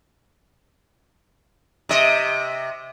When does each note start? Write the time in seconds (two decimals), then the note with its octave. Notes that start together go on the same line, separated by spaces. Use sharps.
1.89 C3 D#5